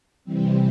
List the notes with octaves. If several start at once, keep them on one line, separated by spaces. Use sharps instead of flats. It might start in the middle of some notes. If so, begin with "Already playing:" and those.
C3 E3 G3 C4